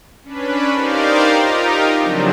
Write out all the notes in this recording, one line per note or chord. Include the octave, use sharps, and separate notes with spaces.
C#4 D4 B4
D#4 G4 A#4 C5 D5 F5
D#4 F4 G4 A#4
C#3 F3 F#3 A3 C4 D4